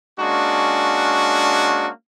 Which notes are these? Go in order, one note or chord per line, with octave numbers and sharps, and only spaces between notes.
G#3 A#3 C#4 D4 F#4